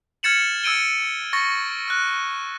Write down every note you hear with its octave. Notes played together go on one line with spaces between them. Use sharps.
F6 G#6 A6 C#7 E7 F#7
E6 G#6 D7 D#7 G7
C#6 A6 A#6 C#7
F6 F#6